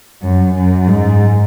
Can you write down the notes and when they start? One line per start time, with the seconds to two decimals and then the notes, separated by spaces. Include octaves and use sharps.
0.22 F#2
0.54 F#2
0.88 G#2